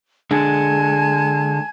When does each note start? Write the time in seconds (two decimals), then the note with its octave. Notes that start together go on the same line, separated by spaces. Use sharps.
0.31 D3 G#3 D4 G#5 A5 G#6